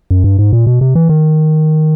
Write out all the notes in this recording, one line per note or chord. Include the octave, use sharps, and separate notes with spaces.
F#2
G2
G#2
A#2
B2
C3
E3
D#3